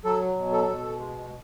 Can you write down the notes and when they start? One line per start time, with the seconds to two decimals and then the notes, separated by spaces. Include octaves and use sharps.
0.05 F#3 A4
0.36 B2
0.52 A4
0.68 B2
0.99 G#3